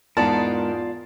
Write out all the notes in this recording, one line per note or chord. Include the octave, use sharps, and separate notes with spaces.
E2 G#2 G#3 B3 F4 A#4 D5 A5